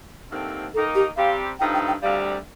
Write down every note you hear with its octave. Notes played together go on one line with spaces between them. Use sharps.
D#2 D3 A3 C4
D#3 A#3 D#4 A4
G4
C3 G3 C4 G4 F5
G2 F3 A3 D#4 G5
G5
G5
D2 C3 G3 F5